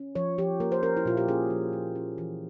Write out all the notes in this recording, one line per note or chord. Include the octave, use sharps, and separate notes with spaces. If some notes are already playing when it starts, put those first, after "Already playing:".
Already playing: C#4
F3 C#5
F3 G4
A#3 A#4
C5
C#4 A#4
E4
A#2 F4
G4
C#4 G#4
F3
F3
C#4
E3